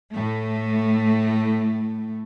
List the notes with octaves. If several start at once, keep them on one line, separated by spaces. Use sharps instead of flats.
A2 A3